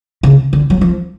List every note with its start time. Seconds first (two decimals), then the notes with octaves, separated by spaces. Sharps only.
0.23 C#3
0.53 D3
0.70 F#3
0.81 F3